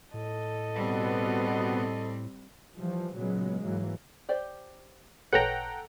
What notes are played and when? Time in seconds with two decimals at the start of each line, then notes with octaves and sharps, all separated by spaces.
0.14 A2 A4 D#5
0.74 B2 G3 B3 C4
2.75 E3 F3 G3
3.14 A#2 C#3 F#3 G#3 B3
3.63 G#2 E3 F#3 A#3
4.29 G4 C5 D5
5.33 A1 A#2 A4 B4 C#5 F#5 G5 A#5